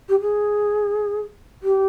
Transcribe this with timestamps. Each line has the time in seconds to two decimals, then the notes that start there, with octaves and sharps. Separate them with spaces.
0.09 G4
0.21 G#4
1.63 G4